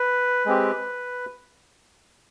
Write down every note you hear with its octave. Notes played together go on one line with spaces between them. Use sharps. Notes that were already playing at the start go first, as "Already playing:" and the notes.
Already playing: B4
G#3 C4 G4